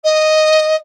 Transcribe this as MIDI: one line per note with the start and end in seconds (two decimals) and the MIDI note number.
0.04 0.75 75